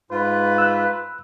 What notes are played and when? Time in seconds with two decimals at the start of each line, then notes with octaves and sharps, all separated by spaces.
0.11 G#2 F4 B4
0.58 E6 F#6